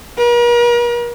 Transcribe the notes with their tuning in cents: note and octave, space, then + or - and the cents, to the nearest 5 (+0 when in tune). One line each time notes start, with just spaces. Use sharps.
A#4 +45